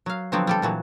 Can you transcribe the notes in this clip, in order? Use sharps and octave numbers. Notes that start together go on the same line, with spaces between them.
F#3 F5
D3 F3 F#3 B3 C4
G3 G4 A4
A#2 E3 F#3